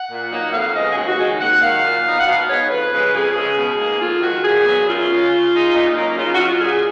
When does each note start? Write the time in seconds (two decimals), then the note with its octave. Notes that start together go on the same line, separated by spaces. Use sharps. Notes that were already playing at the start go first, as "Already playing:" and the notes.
Already playing: F#5
0.10 A#2
0.32 F#3 A#3 D#4
0.53 F2 F5
0.75 C#3 G#3 B3 D#5
0.90 G#4
0.96 D#2 F#4
1.08 F#4
1.18 C#3 G#3 D#4 G#4
1.40 D#2 F#5
1.62 D#3 F#3 F5
1.84 A#2
2.05 F#3 B3 D#4
2.19 F#5
2.26 B2 F5
2.48 G#3 B3 D#4 C#5
2.70 F2 B4
2.92 C#3 G#3
3.14 F2 G#4
3.36 C#3 G#3
3.57 B2
3.79 A#3 D#4
4.01 F2 F4
4.22 D#3 G#3 F#4
4.44 A#2 G#4
4.65 F#3 B3
4.88 F#2 F4
5.10 C#3 G#3 C#4
5.30 C#3
5.53 G#3 D#4
5.74 A#2 D#4
5.96 F#3 A#3 C#4 D#4
6.17 C#3 F4
6.34 F#4
6.39 F#3 C#4 F4
6.61 A#2 G#4